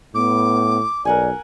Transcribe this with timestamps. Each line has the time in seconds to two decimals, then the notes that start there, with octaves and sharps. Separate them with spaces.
0.15 A2 B3 D6
1.05 B1 A#4 D5 F#5 G#5